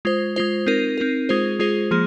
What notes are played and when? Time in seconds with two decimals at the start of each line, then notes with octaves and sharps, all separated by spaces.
0.05 G#3 F4 C5
0.36 G#3 F4 C5
0.67 C4 D#4 A#4
0.97 C4 D#4 A#4
1.29 G#3 F4 G#4 C5
1.59 G#3 F4 G#4 C5
1.91 F3 A#3 G#4